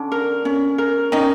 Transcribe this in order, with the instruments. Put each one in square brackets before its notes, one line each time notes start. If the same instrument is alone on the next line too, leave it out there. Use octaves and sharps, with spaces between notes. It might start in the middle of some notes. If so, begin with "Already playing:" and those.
Already playing: [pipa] D3 D4 [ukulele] C#4
[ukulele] A#4
C#4
A#4
[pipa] D#3 D#4 [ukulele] C#4